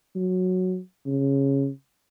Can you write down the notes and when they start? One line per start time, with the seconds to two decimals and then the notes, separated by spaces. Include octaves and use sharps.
0.16 F#3
1.06 C#3